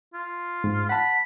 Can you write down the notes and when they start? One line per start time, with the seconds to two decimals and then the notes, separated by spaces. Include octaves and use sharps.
0.14 F4
0.64 G#2
0.89 F#5 A5 B5